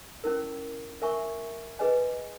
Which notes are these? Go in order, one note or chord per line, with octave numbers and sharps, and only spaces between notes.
C#4 E4 A#4
A#4 E5 G#5 C#6
G#4 B4 D#5 G#5